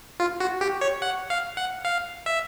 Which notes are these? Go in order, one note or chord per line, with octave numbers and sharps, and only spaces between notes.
F4
F#4
G4
C#5
F#5
F5
F#5
F5
E5